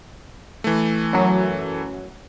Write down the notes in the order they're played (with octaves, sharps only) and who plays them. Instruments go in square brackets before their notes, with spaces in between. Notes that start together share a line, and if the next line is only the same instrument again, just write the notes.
[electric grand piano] E3 A3
[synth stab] F#2 F#3